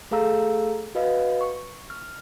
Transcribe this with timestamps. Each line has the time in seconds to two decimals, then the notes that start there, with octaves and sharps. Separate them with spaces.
0.11 A3 G#4 A4 F5 A#5 E6
0.95 F#4 B4 D#5 F5
1.41 C#6
1.90 F6